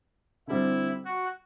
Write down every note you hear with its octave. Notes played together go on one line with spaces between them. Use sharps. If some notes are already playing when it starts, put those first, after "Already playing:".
D3 G3 C4 E4
F#4